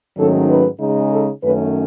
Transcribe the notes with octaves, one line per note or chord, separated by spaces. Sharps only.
G#2 D#3 F#3 A3 C#4 A4
B4
C#3 G#3 D#4
A4
F#2 D#3 A3 C#4 B4